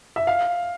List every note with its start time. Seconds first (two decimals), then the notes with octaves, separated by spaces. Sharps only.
0.16 E5
0.27 F5